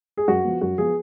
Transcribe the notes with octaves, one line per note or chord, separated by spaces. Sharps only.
G#4
F#2 F#4
F3 B3
F#2 F#4
F3 B3 G#4